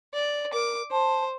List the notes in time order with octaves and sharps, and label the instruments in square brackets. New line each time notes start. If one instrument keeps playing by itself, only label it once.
[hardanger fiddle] D5
[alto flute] A#4 [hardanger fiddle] D6
[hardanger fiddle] C5 [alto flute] A5